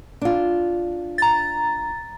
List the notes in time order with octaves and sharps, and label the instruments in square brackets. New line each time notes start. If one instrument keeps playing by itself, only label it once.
[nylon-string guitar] D4 F4
[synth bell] A#5 A6